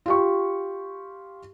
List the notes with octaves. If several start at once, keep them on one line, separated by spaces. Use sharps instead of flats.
F4 G4 C#6